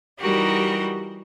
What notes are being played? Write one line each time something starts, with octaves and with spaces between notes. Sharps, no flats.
E3 G3 D#4 F#4 G4 A#4